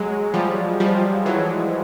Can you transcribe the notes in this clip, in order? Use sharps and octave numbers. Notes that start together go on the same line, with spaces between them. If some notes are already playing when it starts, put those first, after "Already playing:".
Already playing: F#3 G#3
F3 G3
F3 G3
E3 F#3